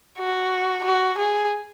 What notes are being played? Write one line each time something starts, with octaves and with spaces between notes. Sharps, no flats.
F#4
F#4
G#4